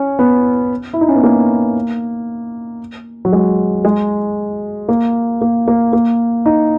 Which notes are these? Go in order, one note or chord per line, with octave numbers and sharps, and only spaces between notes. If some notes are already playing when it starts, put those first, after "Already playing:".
Already playing: C#4
B3
E4
D#4
C#4
B3
A#3
F#3
G#3
G#3
A#3
A#3
A#3
A#3
D#4